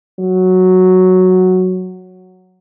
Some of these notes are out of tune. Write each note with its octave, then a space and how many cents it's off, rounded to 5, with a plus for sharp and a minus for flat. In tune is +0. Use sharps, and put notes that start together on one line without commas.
F#3 -5